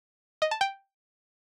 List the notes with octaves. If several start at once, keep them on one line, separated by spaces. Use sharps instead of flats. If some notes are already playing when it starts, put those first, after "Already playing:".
D#5
A5
G5